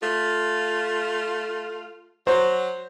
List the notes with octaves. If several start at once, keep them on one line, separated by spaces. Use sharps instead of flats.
A3 F4
F#3 C5